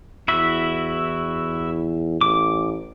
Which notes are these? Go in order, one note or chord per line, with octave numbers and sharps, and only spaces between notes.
E2 E4 F#4 E5
A1 D6